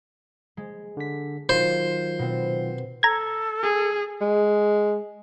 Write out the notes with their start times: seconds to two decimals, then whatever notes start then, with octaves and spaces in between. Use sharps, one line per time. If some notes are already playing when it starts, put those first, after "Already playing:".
0.57 G#3
0.97 D3 B6
1.49 D#3 F#3 F4 C5
2.19 B2 C4
3.03 A4 A#5 G#6
3.63 G#4
4.21 G#3